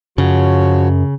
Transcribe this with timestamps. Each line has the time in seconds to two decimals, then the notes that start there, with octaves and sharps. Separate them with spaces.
0.18 F#2 C#3 F3 F#4 C#5